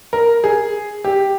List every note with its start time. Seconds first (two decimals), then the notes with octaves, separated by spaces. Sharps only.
0.13 A#4
0.44 G#4
1.04 G4